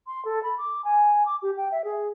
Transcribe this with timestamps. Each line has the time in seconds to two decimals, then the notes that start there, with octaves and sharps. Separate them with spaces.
0.07 C6
0.25 A4
0.43 B5
0.58 D6
0.85 G#5
1.26 D6
1.42 G4
1.57 G5
1.72 E5
1.84 G#4